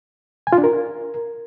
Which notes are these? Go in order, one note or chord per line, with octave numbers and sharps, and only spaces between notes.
G#5
F4
D4
A#4